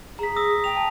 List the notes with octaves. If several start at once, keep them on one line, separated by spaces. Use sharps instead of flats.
G#4 A#5 B6
D#6 E6 A#6
G5 F7
A5